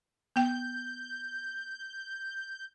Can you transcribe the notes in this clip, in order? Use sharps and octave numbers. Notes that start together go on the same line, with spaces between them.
B3 G5 G6